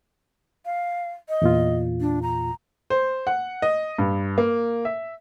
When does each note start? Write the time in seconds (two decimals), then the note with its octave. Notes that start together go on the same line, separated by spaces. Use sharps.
0.66 F5
1.29 D#5
1.42 E2 A#2 F4
2.01 D4
2.23 A#5
2.90 C5
3.27 F#5
3.62 D#5
3.98 G2
4.38 A#3
4.85 E5